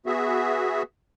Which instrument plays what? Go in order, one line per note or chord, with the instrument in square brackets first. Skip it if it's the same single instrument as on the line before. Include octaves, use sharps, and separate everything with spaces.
[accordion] B3 F#4 G#4 E5